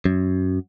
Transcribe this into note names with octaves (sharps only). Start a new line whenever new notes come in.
F#2